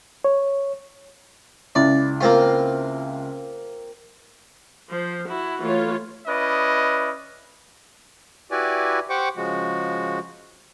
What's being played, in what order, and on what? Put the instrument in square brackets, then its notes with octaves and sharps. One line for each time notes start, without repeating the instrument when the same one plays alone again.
[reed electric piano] C#5
[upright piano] C#2 E4 [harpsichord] D5
[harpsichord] A#3 C4 F4
[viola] F3 C5
E4 F#4
[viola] E3 [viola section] A3 F4 C#5
[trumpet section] C#4 E4 B4 D5 D#5
[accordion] E4 F#4 G4 B4 D5 G#5
G4 C5 F#5 G5 C#6 D6
C#3 F3 G#3 F#4